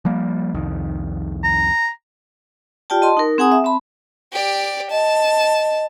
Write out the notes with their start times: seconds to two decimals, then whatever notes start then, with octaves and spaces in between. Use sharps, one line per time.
0.05 F3 G3 A#3
0.54 C2 F2 D#3
1.44 A#5
2.90 F4 G4 D5 G5 A5
3.02 D#5 A5 C6
3.17 D#4 A#4
3.38 C4 G#4 F#5 G#5 A#5 D#6
3.52 E5
3.64 C4 A5 B5
4.33 G4 D5
4.91 D#5 A5